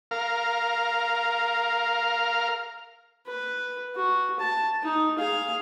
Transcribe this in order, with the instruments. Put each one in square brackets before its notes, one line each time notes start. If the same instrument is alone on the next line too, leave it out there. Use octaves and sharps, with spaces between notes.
[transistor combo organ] A#4 F5
[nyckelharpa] B4
F#4
A5
D#4
G#4 F5